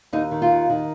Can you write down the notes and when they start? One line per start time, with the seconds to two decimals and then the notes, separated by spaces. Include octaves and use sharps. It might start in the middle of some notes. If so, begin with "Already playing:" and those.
0.13 D#2 D#4
0.31 D#3
0.42 F4
0.51 D#2
0.70 D#3